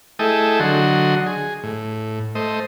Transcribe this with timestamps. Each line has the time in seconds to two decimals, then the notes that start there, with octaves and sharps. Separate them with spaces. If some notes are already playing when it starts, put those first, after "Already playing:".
0.19 A3 E4 G#4 A4 D#5 G5
0.60 D3 F#3 F#4 D#5 C6
1.26 G#4
1.63 A2
2.35 A3 C5 D#5